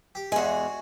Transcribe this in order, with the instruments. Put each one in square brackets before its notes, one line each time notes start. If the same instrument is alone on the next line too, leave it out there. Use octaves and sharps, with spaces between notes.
[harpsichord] G4
[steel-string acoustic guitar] E2 G#3 [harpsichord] F#4 G#4